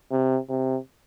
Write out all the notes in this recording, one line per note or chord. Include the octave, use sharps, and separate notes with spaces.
C3
C3